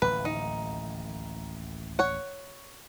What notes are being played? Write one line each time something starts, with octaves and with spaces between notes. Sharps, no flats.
D1 A1 D#2 B4
D#4
C#5 F#5